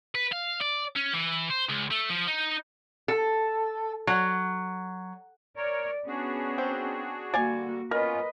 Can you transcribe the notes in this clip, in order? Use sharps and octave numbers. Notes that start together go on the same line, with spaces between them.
B4
F5
D5
C#4
E3
C5
C#2
A3
F3
D#4
A4
F#3
A#4 C#5 D5
B3 C#4 D4 F#4 G#4
C4
D3 G3 A#3 F#4 D5 F5 G#5
B3 C#4 F4 A#4 B4 D#5